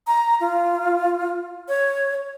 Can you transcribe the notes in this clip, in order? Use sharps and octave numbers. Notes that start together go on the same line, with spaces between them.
A#5
F4
C#5